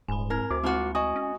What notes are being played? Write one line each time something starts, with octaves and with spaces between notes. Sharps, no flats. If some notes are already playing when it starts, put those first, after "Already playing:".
D#1 G#2 G#5 B5
C4 A#4 G#6
D2 F#4 C5 D6
G#3 A#3 C4 F4 F#4 B5
F#4 D#5 G#5 D#6
C#4